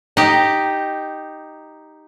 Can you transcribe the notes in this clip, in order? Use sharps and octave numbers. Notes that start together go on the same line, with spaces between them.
D#4 G4